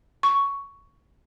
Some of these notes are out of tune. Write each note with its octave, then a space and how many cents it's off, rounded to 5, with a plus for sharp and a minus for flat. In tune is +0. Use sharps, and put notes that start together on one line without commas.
C#6 +10